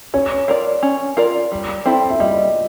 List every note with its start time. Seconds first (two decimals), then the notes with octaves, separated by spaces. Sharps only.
0.14 C#4 C#5
0.48 F4 A#4 D5
0.83 C#4
1.17 F4 A#4 D5
1.52 G3
1.86 C4 E4 A4
2.10 E5
2.20 G3 D#5